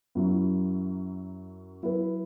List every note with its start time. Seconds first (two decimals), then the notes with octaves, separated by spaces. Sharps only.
0.15 F#2 F#3 E4
1.83 F#3 E4 B4